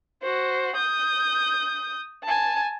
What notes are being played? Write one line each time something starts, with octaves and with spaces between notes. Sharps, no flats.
F#4 C5
D#6 G6
G#5 A5